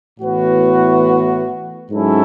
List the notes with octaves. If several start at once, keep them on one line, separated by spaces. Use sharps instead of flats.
A2 E3 B3 F#4 B4
G#2 F#3 C#4 E4 A4